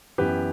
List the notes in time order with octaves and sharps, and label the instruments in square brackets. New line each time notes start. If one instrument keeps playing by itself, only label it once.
[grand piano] F#2 E3 B3 G4 B4